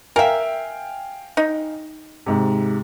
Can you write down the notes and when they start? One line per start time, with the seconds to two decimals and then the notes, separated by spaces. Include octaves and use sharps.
0.16 A#4 E5 F5 G5 G#5
1.37 D#4
2.26 G#2 C3